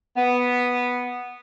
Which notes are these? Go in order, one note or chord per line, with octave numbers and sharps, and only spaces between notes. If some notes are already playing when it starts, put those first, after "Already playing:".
B3